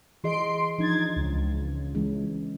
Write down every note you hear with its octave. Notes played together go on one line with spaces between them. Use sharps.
E3 G#4 D#5 C6 C7 D7
F3 D4 D#4 G#6 A6
C#2
E3 G#3 C#4